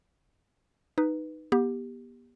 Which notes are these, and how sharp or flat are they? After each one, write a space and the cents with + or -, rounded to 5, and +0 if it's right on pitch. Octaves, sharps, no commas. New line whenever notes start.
D#4 -5 B4 +0
B3 -35 G4 +10